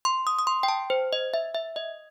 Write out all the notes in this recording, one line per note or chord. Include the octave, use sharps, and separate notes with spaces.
C6
D#6
D#6
C6
G5
A5
C5
D#5
E5
E5
D#5